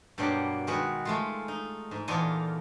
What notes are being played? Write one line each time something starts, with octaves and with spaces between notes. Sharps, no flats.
G2 B2 F#3 G3 A#3 G4
D#3 G#3 F#4 G#4 B4
G#3 A3 F4
D#4
G#2
E2 A#2 F4 A4 D#5 G#5